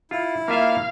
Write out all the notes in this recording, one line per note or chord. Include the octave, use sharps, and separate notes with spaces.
E4 F4
A#3 F4 E5 F5